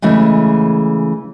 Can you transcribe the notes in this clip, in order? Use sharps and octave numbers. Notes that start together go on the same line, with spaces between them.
C#3 E3 G#3 A3